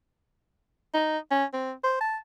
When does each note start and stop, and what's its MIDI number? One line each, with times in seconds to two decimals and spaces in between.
0.94 1.18 63
1.31 1.45 61
1.53 1.73 60
1.84 1.97 72
2.01 2.17 81